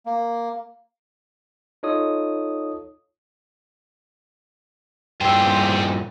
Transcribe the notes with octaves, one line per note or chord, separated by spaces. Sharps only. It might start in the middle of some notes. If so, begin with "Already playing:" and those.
A#3
D#4 F4 A4 C#5 D#5 D#6
G2 A#2 G#4 C5 G5 E6